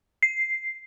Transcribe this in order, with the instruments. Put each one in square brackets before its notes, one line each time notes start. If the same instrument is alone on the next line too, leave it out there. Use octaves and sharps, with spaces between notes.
[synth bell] C7